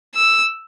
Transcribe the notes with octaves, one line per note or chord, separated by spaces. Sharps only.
E6